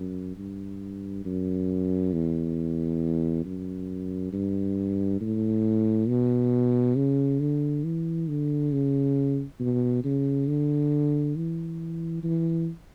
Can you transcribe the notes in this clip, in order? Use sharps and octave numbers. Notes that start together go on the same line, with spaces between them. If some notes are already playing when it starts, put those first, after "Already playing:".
Already playing: F#2
G2
F#2
E2
F#2
G2
A2
B2
C#3
D3
E3
D3
C#3
B2
C#3
D3
E3
E3